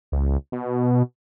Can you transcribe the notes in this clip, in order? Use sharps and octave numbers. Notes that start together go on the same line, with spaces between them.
C#2
B2